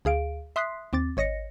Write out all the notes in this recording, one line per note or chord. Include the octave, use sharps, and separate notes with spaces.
D2 G#4 F5 D7
E5 C6 D#6 F#6 B6 C7
D#2 C4 D6 A6
G#1 C#5 D#5 A#6 C#7